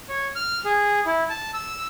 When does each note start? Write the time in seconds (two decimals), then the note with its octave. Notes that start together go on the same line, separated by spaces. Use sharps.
0.09 C#5
0.35 F6
0.65 G#4
1.06 E4
1.30 A5
1.54 E6